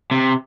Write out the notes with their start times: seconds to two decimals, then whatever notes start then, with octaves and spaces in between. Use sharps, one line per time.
0.11 C3